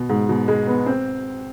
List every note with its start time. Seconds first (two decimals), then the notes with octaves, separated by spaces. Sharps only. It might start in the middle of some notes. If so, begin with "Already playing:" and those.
Already playing: B2
0.09 G#2
0.29 B2
0.48 G#3
0.67 B3
0.86 C4